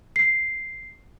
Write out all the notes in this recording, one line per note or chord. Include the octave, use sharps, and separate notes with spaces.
C7